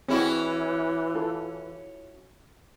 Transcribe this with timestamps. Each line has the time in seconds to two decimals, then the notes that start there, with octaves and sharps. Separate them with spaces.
0.08 E3 C4 C#4 E4 F#4 G#4
1.14 F4 A4